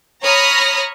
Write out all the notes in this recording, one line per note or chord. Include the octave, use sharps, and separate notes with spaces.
C#5 A#5 B5 D#6 F6 A#6